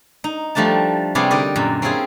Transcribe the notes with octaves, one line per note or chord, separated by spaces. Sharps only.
D#4
F3 G3 A3 D4 A5
C3 G3 B3 C#4 G4 G#4
D3 D#4 G4 A#4 D5 D#5
F#2 A#2
C4 C#4 E4 F4 G#4 C#5